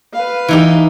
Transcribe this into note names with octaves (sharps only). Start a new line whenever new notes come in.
B4 F5
E3 D#4 G4